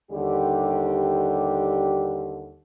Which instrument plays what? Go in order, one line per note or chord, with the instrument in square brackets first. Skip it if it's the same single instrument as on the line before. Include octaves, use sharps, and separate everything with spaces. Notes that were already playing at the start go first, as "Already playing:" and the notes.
[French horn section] D#2 D3 G3 G4